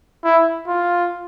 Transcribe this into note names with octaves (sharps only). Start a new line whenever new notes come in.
E4
F4